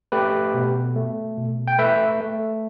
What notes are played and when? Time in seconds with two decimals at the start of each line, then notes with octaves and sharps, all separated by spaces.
0.12 A3 G4 B4
0.54 B2
0.96 A3
1.37 B2
1.68 G5
1.79 A3 B4 E5
2.21 A3